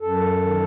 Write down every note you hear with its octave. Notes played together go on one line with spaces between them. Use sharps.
F#2 A4
D#3